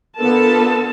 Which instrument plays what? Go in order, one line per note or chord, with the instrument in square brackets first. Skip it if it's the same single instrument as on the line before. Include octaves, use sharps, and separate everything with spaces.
[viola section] D3 B3 F4 A4 A#4 A5